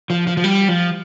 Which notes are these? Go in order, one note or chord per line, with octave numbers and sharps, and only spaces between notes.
F3
F3
F3
G3
F3